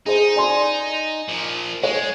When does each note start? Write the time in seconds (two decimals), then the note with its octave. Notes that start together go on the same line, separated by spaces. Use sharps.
0.06 D#4 G#4 C5
0.36 D5 G#5 C6
1.28 A#2 F3
1.83 G#3 C#5